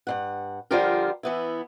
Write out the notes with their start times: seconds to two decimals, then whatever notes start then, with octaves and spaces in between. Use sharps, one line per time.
0.07 G2 C#3 F#5
0.71 D3 F3 G3 F4 G4 A#4
1.23 E3 B3 E4